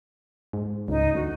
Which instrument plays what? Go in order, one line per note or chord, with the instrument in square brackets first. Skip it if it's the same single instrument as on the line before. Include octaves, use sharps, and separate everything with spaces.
[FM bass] G#2
[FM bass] C#2 [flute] D#4
[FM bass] D2 [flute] F#4